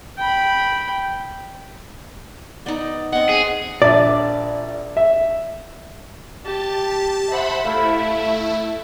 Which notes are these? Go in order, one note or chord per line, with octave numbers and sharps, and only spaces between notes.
G5 B5
B3 D#4 D5
B3 C4 D#5 F#5
G#4
A#1 D5 E5
E5
G4 A5
C5 E5 F#5 B5
A3 E4 F5 B5